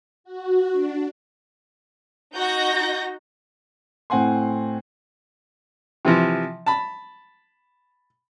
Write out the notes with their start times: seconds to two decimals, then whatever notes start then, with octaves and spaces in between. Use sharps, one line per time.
0.24 F#4
0.72 D4
2.36 D#4 F#4 G6 A#6
4.10 A2 C4 F#5 G#5 C6
6.05 C3 E3 F3
6.66 A5 B5